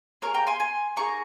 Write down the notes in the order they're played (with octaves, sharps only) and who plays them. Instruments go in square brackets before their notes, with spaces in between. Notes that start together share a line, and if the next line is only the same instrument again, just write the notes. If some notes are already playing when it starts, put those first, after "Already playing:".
[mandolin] A#3 F4 G#4 A#4 C#5
G5 A#5
G#5 C6
G#5 C6
A#3 D#4 G#4 A#5 C#6